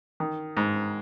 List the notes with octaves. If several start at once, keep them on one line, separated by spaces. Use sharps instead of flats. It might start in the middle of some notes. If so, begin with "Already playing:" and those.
D#3
G#2